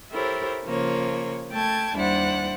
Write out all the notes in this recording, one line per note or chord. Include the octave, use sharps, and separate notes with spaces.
E4 G4 A4 A#4 C5 C#5
C#3 F3 A#3 C#5
A3 G5 A5 G#6
D#2 G3 D4 E4 C5 F#5